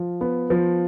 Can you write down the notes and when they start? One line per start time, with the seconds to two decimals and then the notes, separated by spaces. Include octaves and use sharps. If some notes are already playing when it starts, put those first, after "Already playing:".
Already playing: F3
0.21 B3
0.50 F3